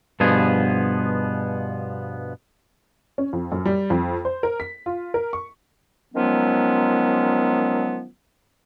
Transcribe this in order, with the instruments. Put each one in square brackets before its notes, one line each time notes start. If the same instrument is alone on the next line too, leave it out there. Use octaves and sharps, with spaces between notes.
[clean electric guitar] G2 B2 F3 B3 G#4
[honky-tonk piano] C#4
F2
F#2
G3
F2
C5
A#4
B6
F4
A#4
C#6
[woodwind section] D#3 F3 F#3 G#3 B3 C#4